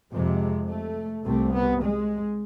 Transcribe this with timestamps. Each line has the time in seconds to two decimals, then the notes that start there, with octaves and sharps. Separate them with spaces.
0.12 F2 C3 G#3
0.69 A3
1.26 C2 C3 A3
1.53 B3
1.82 G#3